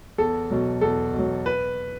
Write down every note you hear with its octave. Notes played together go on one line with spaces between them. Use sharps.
E2 A4
B2 F#3
E2 A4
B2 F#3
B4